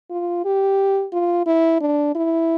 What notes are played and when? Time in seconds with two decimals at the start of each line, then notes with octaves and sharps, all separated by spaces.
0.11 F4
0.45 G4
1.13 F4
1.46 E4
1.81 D4
2.15 E4